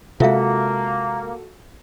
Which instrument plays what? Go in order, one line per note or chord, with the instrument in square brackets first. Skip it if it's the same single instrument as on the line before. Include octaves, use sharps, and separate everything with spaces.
[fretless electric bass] C3 G#3 [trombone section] A#3 [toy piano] F4 E5 F5 [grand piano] F#4 A4